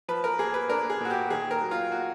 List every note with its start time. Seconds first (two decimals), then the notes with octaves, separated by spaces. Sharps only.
0.09 F3 B4
0.24 A#4
0.39 A#3 G#4
0.54 B4
0.70 D4 A#4
0.90 G#4
1.00 A#2 F#4
1.10 G4
1.30 D#3 G#4
1.51 A#4
1.61 F#3
1.71 F4
1.92 F#4